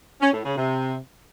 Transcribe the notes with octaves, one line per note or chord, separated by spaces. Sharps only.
C#4
A2
C#3
C3